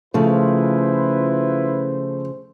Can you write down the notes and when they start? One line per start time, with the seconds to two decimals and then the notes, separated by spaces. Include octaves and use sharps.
0.14 C#3 F3 A3 E4 F4 B4 C5